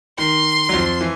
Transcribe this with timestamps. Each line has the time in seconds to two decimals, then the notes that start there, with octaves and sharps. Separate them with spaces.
0.18 D#3 C6
0.69 F#3
0.73 F2 F3
1.01 E3